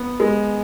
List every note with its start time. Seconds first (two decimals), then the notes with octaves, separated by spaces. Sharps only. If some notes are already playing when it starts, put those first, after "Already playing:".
Already playing: B3
0.20 G#3